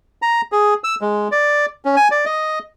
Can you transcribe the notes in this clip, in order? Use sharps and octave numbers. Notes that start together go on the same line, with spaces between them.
A#5
G#4
E6
G#3
D5
C#4
G#5
D5
D#5